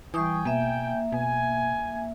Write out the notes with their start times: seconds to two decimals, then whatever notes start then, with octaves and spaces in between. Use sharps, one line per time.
0.14 E3 G3 G5 G#5 C#6 D#6
0.45 B2 A#3 E5
1.12 B2 G#5